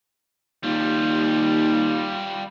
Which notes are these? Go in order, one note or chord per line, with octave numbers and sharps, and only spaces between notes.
D#2 G3 F4